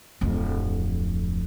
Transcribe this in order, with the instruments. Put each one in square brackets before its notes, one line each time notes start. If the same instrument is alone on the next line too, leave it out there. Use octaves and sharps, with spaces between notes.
[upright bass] D1 F2